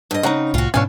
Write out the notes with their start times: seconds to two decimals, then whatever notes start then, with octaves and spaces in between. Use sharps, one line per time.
0.11 G2 D#5
0.23 C#3 C4 D#4 F#5 A#5
0.54 C2 A2 F4 F#4
0.74 G#2 B2 E3 C#4 D4 C#5 F5 G#5